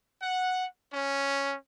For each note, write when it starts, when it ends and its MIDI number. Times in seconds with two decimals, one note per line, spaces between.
0.22 0.67 78
0.93 1.56 61